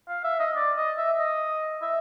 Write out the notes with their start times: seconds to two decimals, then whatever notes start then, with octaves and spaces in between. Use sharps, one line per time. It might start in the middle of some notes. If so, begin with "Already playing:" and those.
0.08 F5
0.24 E5
0.39 D#5
0.56 D5
0.76 D#5
0.98 E5
1.19 D#5
1.82 E5